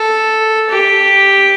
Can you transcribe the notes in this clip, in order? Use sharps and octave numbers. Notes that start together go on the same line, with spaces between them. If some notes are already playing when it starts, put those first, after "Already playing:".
Already playing: A4
G4